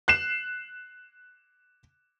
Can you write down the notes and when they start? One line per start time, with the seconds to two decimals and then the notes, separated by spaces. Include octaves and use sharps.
0.08 F#6 C7 E7